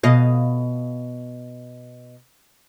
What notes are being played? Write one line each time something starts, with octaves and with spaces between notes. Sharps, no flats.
B2 D#5 F5